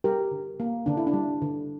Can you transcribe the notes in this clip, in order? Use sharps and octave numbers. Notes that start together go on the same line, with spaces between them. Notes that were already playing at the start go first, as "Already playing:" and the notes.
G3 G4 A#4
D3
A#3
D3 D4
E4
D4
G3
D3